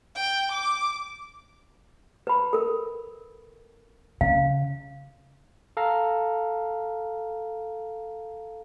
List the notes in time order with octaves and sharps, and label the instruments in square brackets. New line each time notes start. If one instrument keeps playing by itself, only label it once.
[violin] G5
D6
[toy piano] B4 B5
A4 A#4
[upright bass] C#3 [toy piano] F5
[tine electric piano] A4 F5 A#5